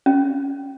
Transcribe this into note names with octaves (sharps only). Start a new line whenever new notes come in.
C#4